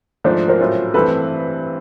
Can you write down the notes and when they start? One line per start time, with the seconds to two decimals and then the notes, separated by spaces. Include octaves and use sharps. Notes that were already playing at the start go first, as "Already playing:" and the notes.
0.24 G#2 F3 A3 D4 C5
0.48 A#4 C5
0.60 A2 F#3 A3 C#4 F4
0.94 G2 E3 A3 C4 E4 A4 B4